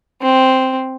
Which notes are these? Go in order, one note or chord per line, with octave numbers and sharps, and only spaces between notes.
C4